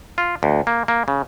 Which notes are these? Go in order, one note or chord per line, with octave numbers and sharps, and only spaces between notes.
F4
D2
A#3
A#3
C#3